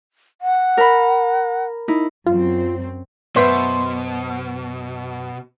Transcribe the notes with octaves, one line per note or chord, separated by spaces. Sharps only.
F#5
A#4 B5
D#4 E4
F#2 C4 F4
F#2 B2 B4 C5 E5